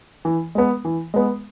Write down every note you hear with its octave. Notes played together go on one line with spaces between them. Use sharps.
E3
G#3 B3
E3
G#3 B3